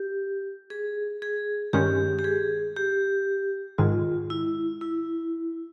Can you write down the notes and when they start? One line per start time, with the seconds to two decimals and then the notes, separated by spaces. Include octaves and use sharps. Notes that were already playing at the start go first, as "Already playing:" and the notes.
Already playing: G4
0.70 G#4
1.22 G#4
1.73 G2 D#3 G#3 C#4 G4
2.19 G4
2.24 G#4
2.76 G4
3.78 G#2 D#3 G#3 F4
4.30 E4
4.81 E4